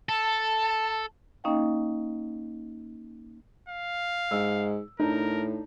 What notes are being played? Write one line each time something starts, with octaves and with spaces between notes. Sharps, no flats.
A4 A5
A#3 C#4 D#4 D#5 F5 G5
F5
G#2 E6
A2 D4 D#4 A#4